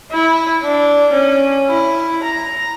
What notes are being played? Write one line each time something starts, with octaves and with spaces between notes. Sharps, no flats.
E4
D4
C#4
E4
A#5